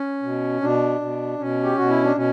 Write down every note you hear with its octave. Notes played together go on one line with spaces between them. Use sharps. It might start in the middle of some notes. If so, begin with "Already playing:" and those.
Already playing: C#4
B2
B2 D4
B2
B2 C#4
G4
B2 F#4
E4
D4
B2 C#4